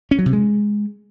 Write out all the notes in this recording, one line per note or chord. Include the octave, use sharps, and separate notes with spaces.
C#4
F#3
C3
G#3